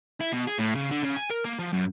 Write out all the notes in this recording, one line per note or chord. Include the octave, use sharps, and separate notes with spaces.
E4
B2
G#4
A2
C#3
D3
C#3
G#5
A#4
A#3
F3
F#2